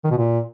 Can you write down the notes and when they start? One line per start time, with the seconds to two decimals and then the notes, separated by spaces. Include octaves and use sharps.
0.04 D#3
0.11 B2
0.17 A#2